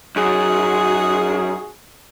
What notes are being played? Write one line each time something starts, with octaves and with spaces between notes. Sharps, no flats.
F#2 D#4 F#4 G#4